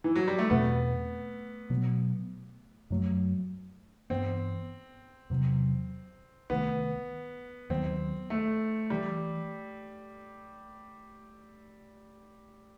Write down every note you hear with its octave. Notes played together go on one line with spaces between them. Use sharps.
E3
F#3
G3
A3
E2 B2 A3 B3 C4
B2 F#3 B3
F#2 F#3 A3
G2 E3 B3 C4
E2 C3 F#3
C2 C3 D#3 A3 B3
D#2 D#3 F#3 B3 C4
A3
E3 G3